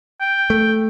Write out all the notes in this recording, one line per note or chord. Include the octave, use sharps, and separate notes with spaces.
G5
A3